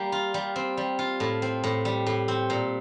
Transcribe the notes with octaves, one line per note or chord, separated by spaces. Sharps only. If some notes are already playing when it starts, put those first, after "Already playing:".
Already playing: G3 A#3
F4
G3
C4
G3
F4
A2
C4
A2
G3
A2
C4
A#2